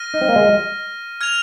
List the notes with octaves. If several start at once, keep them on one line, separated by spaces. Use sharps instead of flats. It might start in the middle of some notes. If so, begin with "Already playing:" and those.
Already playing: F6 A#6 D#7
D#4
C4
A#3
G#3
F6 G#6 F7